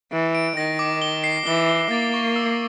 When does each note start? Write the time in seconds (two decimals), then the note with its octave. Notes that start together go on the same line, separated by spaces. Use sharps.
0.12 E3 D7
0.35 D7
0.56 D#3 A#6
0.79 D6
1.02 G7
1.24 C7
1.46 E3 G7
1.69 G7
1.91 A#3 A6
2.14 C#6
2.36 E6